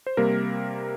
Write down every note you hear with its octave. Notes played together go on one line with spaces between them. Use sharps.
C5
C3 G3 A#3 A#4